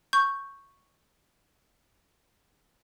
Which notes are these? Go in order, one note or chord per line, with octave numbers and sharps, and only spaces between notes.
C#6 G6